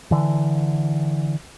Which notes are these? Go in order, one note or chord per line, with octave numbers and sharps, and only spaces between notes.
D3 E3